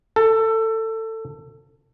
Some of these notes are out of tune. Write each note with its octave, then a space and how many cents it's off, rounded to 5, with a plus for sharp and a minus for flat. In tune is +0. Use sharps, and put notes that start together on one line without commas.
A4 +20